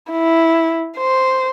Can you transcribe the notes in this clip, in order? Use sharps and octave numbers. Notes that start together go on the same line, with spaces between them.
E4
C5